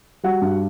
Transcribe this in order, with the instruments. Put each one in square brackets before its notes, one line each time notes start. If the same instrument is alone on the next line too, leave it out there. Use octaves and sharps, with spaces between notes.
[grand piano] G3 F#4 F#5
G2